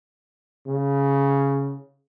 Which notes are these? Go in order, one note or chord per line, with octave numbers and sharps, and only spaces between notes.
C#3